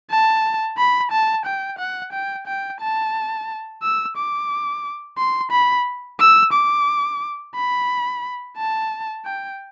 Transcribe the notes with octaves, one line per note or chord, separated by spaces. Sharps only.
A5
B5
A5
G5
F#5
G5
G5
A5
E6
D6
C6
B5
E6
D6
B5
A5
G5